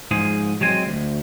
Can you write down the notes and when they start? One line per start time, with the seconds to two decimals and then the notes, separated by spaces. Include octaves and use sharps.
0.11 G#2 F3 G#4
0.61 F#3 G#3 C4 G#5
0.86 D2